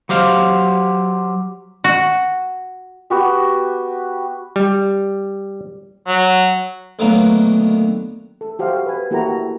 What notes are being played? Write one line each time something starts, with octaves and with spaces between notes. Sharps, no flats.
F#3 G4 C5 F5
F#4
B3 F#4 G4
G3
F#3
D2 D3 D#3 F#3 A#3 B3
A4
F#4 G4 C5 E5 F5
B4 G#5
A#3 E4 F#4 G4 A4 A#5